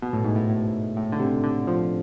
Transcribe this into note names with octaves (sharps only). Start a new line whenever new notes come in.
B2
A2
G#2
A2
A2
A2
D3
C3
D3
F3